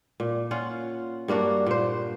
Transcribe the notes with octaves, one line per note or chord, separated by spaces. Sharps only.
A#2
C#4 F4 F#5
G2 A#3 D4 F#4
A#2 C5